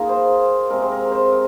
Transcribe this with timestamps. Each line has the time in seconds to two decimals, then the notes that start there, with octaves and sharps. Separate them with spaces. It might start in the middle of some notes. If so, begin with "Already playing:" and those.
Already playing: D#3 A#3 F4 G#4 A#4
0.09 C5
0.71 C3 G#3 A#4
0.82 C5
0.92 A#4
1.12 C5
1.32 A#4